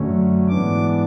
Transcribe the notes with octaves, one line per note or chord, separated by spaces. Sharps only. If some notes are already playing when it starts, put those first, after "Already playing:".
Already playing: F#2 D3 F#3 A3 C#4
G#2 E3 B3 D4 D6